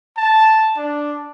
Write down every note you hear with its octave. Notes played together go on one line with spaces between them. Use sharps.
A5
D4